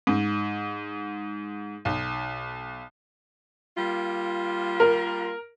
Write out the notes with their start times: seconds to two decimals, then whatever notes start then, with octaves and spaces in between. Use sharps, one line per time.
0.07 G#2
1.85 B1
3.77 G3 A#3 F4
4.80 A#4